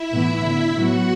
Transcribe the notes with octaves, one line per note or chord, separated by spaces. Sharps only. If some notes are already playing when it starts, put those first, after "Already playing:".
Already playing: E4 E5
A2 E3 B3
D3 B3
A2 F#3 B3 F#4 F#5